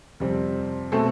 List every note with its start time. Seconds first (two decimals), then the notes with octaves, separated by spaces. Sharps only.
0.20 F2 C3 G3 C4
0.92 B2 A3 C4 A4 C5